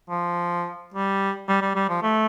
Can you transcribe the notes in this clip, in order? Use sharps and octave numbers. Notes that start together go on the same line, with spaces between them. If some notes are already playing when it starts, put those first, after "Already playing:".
F3
G3
G3
G3
G3
F3
A3